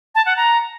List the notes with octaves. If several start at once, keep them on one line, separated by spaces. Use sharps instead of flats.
A5
F#5
A#5